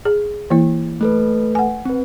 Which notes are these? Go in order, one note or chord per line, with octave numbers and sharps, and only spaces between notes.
G#4
E3 A#3 E4
A3 A4 B4
F#5 G#5
C4 B4